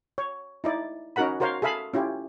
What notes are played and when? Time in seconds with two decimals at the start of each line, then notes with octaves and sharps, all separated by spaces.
0.18 C#5
0.64 D#4 E4 D5
1.16 C#4 D#4 F#4 A#4 F#5 B5
1.40 F#4 A#4 C5 C#5 F5
1.62 G#4 A4 E5 F5 B5
1.94 C#4 E4 F4 G4